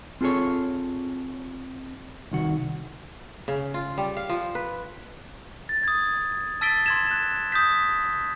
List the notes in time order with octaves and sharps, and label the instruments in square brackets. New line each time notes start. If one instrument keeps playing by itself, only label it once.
[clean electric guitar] C4 F4 G#4 A4 C#5
C2 D#3 F#4
[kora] C#3
F4
G3
F5
F3
B4
[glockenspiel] A6
D#6 G#6
A5 E6 A6 B6 D7 G7
C6 G#6 E7
F#6
D#6 G6 B6